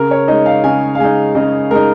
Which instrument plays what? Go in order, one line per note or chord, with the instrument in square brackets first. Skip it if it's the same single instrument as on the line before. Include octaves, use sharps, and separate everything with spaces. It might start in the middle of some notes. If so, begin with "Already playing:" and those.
Already playing: [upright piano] C#3 A#4
C#5
G#3 D#4 D#5
F5
C#3 G#5
F5
G#3 D#4 G#5
C#3 D#5
G#3 D#4 A#4